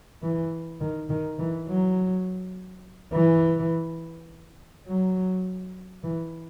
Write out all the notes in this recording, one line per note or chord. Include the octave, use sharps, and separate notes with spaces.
E3
D#3
D#3
E3
F#3
E3
F#3
E3